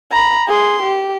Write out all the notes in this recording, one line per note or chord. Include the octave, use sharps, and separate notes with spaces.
A#5 B5
G#4 C6
G4